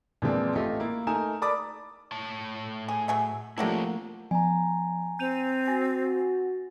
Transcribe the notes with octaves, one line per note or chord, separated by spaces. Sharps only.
A#2 E3 F3 G#3 C4 D4
A1 A3 F4 G4 D#5
A#3 E4
A3 D#4 A#4 G#5 E7
A4 A#4 D5 B5 D6 D#6
A2 C#5 A5
G#4
F#3 G#4 E5
C3 F3 F#3 A3 A#3 D4 E4 G4
F3 G#5 A#5
C4 G6 D#7 F7
F#4 G#5 A6 A#6